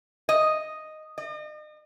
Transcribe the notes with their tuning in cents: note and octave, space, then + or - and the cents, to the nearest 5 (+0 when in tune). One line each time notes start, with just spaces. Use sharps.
D#5 +0
D#5 -40